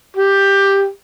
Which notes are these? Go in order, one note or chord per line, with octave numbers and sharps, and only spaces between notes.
G4